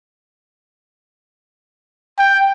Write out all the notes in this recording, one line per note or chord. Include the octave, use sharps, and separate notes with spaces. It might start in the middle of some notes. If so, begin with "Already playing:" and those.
G5